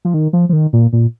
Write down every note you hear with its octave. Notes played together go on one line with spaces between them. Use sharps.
F3
D#3
F3
F3
D#3
A#2
A#2